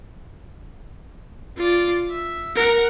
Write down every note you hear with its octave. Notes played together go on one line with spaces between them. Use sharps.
F4 D5
E5
A#4 F#5